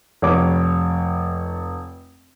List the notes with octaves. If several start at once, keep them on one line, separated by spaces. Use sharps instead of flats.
F1 C#5 D6